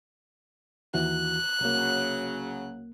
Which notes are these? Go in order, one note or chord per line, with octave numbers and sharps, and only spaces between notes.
D#2 E3 F#4 F#6
C2 C#3 F#3 A#3